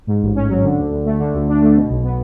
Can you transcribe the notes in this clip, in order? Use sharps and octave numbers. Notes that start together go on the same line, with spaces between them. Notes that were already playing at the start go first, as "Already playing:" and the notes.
G#2
A1
C#4
F#3
D3
D2
D2
A3
D3
D2
D4
A3
B2
B1
B3